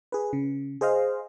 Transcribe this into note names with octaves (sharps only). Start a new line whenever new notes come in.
G#4 B4
C#3
G#4 C5 D#5 F5